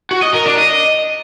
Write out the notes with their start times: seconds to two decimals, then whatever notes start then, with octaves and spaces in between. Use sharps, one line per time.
0.11 F#4
0.22 D#5
0.34 A#4
0.46 D4
0.57 D#5